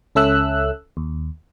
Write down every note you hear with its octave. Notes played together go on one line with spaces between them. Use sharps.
C#2 C#4 A4 E5 E6 F#6
D#2